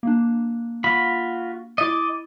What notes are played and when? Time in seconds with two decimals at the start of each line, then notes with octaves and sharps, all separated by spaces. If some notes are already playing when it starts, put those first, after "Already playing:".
0.03 A#3 D4
0.84 F4 F#4 B5
1.78 E4 D#5 D6 A6